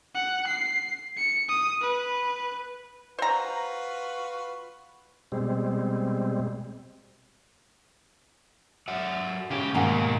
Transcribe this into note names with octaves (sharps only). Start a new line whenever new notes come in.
F#5
C7
C#7
D#6
B4
F4 F#4 B4 C5 A#5
B2 G3 G#3 C4
F#3 E5 F#5
G#2 C#4 G4 F5
D#2 G#2 B2 A#3 F5 F#5 G#5 A#5